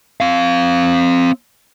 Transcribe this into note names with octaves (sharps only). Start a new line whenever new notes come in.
C4 F5